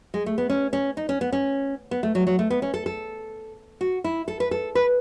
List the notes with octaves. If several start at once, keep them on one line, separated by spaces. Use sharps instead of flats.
G#3
A3
B3
C#4
C#4
D#4
C#4
B3
C#4
B3
A3
F#3
F#3
A3
B3
C#4
A4
A4
F#4
E4
A4
B4
A4
B4